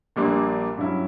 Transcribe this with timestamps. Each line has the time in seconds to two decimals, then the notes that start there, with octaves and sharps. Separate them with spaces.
0.16 A#1 A#2 G3 A#3 D4
0.77 G2 F#3 C#4 E4